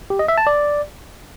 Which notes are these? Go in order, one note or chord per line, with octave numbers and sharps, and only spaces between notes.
G4
D#5
E5
A5
D5